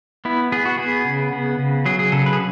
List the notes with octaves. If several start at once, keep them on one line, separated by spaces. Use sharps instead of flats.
B3 E4
B3 G#4
F#4
B3 G#4
C#3
B3
C#3
F#3 G#4
G#4
C#3 A4
B4
G#4